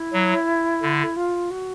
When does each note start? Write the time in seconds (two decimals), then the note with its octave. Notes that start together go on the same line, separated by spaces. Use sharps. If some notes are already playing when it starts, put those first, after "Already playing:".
Already playing: E4
0.13 F#3
0.82 D3
1.16 F4
1.50 F#4